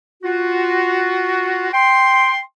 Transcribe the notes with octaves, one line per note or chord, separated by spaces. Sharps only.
F4 F#4
G5 C6